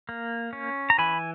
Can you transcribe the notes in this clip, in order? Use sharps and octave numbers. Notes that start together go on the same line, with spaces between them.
A#3
C#4
A#5
E3 G#5 B5